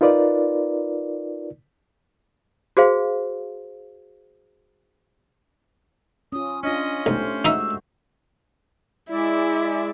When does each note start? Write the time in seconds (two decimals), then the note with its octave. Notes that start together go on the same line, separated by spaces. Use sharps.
0.01 D#4 F4 A#4 B4 D5
2.77 F#4 G#4 C5 F5
6.32 C#4 F4 D#6
6.63 C#4 D4 F4 D#5
7.06 B1 A3 G4 C5
7.45 G#3 D#4 F#4 D#5 E5 E6
9.11 G#3 E4 D5 E5